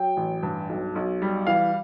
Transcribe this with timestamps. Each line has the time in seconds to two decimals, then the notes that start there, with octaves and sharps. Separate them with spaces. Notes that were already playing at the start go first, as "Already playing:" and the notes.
Already playing: F#3 G5
0.17 A1
0.43 G2
0.69 B1
0.96 B1
1.22 G3
1.47 E3 F5